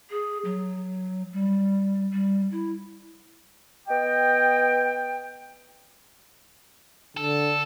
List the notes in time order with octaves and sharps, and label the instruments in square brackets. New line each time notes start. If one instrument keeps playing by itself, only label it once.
[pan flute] G#4
F#3
G3
G3
E4
[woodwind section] B3 D#5 G5
[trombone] D3 [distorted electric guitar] A4